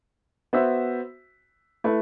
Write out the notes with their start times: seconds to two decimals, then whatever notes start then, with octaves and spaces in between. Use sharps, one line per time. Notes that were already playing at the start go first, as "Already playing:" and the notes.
0.53 B3 F#4 C5 E5
1.84 A3 E4 B4